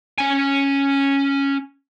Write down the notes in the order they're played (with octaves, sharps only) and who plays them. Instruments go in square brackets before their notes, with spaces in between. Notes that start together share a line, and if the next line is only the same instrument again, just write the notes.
[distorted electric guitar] C#4 G#5